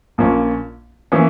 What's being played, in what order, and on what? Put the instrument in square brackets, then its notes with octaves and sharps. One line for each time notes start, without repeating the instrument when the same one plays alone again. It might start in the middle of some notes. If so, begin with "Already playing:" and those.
[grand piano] A#1 A#2 A#3 C#4
E3 A#3 C#4